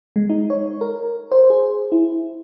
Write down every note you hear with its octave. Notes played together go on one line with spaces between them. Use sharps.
G#3
D#4
C#5
A#4
C5
G#4
E4